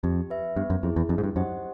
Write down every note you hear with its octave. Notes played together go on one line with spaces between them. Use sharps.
F2 G4
B4 E5
G2 B3
F#2
F2 E4 G#4
E2
F2 D#4
G#2
G2
F#2 G4 C5 D#5 F#5